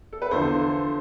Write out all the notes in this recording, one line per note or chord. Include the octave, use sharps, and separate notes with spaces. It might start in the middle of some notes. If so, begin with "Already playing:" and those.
A4
B4
E2 D3 F3 A4 C5